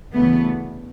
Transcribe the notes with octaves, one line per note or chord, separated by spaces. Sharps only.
D2 C#3 E3 A3 B3